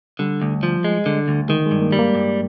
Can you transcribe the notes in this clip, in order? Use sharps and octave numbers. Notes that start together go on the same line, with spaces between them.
D3 G3
D2
F3
G#3
D3
D2
D#3 G#3
G#3
G2
A#3
G3
A#3
G2